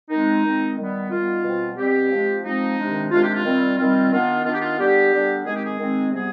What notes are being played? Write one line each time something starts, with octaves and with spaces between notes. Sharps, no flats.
D#3 G#3 C4 D#4
D#3 G#3 C4
D#3 G3 B3
D#3 G3 B3 F4
B2 G3 C4
B2 G3 C4 G4
F3 G#3 C4
F3 G#3 C4 D#4
C3 D#3 G#3 D4
C3 D#3 G#3 D4 F4
G4
F4
D#3 G3 C4
D#3 G3 C4 F4
D#3 B3 D4 F4
D#3 B3 D4 F4
G4
F4
D3 G3 B3 D4 G4
D3 G3 B3 D4
D#3 G#3 C4 G#4
G4
G#4
D#3 G#3 C4
C3 G3 B3 G#4